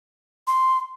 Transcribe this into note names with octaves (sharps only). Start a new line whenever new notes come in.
C6